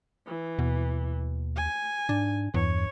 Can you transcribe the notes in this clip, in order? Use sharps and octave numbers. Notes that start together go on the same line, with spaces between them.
E3
D#2 B2
G#5
G#2 D4
E2 G2 C#5